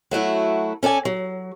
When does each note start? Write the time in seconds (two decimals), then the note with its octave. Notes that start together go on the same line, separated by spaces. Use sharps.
0.11 F#3 A3 E4 F#4
0.83 C#4 A4 D5 G#5
1.05 F#3